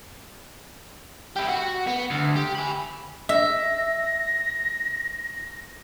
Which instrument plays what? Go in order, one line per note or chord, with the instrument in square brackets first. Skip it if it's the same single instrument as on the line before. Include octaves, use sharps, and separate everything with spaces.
[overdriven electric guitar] E4 G4
F#4
B3
D2
G4
G#5 B5
[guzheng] E5 [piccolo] A#6